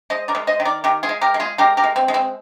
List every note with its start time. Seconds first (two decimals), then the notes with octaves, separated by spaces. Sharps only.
0.10 G#3 C5 D#5
0.28 A#4 D5
0.35 G#3
0.47 C5 D#5
0.60 D#3
0.65 A#4 D5
0.84 D#3 G4 A#4
1.03 F4 G#4
1.09 G#3
1.21 G4 A#4
1.34 G#3
1.40 F4 G#4
1.58 G#3 G4 A#4
1.77 G4 A#4
1.84 G#3
1.96 C4
2.08 G#3
2.14 C4